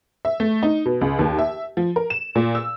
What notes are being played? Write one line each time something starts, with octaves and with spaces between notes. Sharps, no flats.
E5
A3
D#4
B2
C#2
D#2
E5
F3
A#4
E7
A#2
E6